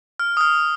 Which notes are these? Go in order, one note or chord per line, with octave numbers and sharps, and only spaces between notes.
F6
D#6
F6